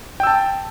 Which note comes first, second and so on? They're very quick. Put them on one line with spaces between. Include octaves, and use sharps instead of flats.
G5 E6 A5